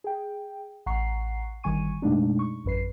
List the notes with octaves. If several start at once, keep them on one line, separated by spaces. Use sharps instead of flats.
G#4 G5
A1 F#5 A#5 C#6 C7
G1 D#3 G3 G#5 C#6 D#7
F#2 B2 G#3 A3 D4 D#4
C#6
A1 F#2 B4 C7